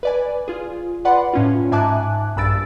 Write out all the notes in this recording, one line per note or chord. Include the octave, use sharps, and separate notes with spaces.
B4 D5 G#5
F4 G#4
B4 D5 F#5 B5 C6
A2 C#4 F4
G#2 E5 G#5 A5 D6 F#6
A#1 G2 B5 E6 A6 D7